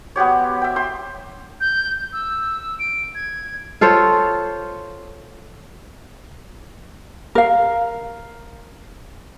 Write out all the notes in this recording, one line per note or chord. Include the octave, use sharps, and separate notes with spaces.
B3 F#4 G4 C#5
E5 G5
E5 G5 C6
G6
E6
D7
G#6
F4 A4 C5 C#5
A#4 F5